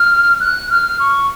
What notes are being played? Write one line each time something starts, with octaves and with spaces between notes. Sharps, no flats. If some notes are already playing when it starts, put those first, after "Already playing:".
Already playing: F6
F#6
F6
C#6